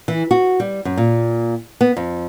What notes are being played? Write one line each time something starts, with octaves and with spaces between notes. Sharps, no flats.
E3
F#4
G3
F#2
A#2
B3
F2